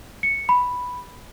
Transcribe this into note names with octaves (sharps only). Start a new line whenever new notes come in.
C#7
B5